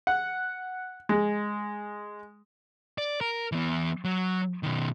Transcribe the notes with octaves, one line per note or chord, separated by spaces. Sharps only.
F#5
G#3
D5
A#4
E3 B3
F#3
B2 D#3